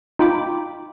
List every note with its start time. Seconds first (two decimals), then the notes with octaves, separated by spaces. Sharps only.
0.19 D#4 F4 G5 B5 D6